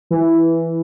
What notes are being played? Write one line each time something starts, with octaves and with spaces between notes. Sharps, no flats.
E3